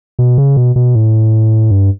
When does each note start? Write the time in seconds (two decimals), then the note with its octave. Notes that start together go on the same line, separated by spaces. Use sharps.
0.19 B2
0.38 C#3
0.57 B2
0.76 B2
0.95 A2
1.70 G2